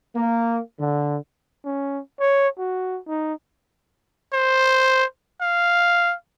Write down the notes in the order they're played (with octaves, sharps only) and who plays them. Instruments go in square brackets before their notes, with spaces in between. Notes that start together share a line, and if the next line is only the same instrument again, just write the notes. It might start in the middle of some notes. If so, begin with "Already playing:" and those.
[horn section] A#3
D3
[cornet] C#4
C#5
F#4
D#4
[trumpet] C5
F5